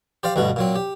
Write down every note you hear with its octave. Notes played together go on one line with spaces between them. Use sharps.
G4 C5 D5 F5
D2 G2 B2 F#4
A#2 F#3 C4
G4